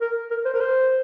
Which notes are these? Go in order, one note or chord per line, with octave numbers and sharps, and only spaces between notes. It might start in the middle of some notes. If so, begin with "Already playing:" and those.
A#4
A#4
C5
A#4
C5